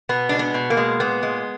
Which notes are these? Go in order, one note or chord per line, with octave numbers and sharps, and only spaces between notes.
B2 B3
G#3 D4
B3
B2
A#3
G#3
A#2 B3
G#3